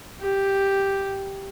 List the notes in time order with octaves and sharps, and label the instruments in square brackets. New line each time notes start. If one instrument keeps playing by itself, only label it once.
[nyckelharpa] G4